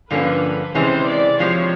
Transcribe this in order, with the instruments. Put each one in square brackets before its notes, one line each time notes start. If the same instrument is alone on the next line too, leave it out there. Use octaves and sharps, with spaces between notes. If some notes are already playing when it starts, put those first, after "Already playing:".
[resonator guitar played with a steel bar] G2 D3 F3 A#3 C#4 [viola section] B4
[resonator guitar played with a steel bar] C3 E3 G#3 C#4 [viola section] C5
[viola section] D5
[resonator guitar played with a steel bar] C3 F3 G#3 [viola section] C#5